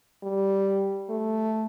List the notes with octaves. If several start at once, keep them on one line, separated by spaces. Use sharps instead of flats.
G3
A3